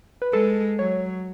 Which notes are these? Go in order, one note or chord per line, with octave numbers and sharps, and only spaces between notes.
B4
G#3 A4
F#3 C#5